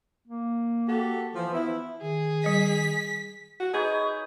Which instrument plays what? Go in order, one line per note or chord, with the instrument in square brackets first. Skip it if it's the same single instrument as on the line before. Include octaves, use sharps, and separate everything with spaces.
[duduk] A#3
[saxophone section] F#4 G4 A4
[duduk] E3 [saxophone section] F3
[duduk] B3 [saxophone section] E4
[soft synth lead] D#3 [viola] G#4
[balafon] G3 D#5 [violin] B6
[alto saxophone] F#4
[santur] D#4 B4 C#5 [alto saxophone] G#4